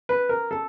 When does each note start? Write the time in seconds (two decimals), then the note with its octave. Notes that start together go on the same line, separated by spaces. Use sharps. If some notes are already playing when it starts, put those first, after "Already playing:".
0.09 B4
0.29 A#4
0.51 A4